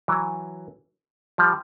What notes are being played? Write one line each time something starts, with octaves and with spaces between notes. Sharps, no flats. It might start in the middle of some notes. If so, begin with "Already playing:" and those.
E3 F#3
F3 G3